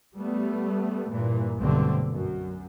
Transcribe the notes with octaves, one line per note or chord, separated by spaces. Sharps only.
G3 A3 B3
G2 A#2 E3
B1 G2 D3 A3 C4
F#2